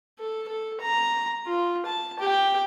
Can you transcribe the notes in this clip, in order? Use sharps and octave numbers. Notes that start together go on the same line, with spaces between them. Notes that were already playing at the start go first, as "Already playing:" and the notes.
A4
A4
A#5
F4
A5
G4 G5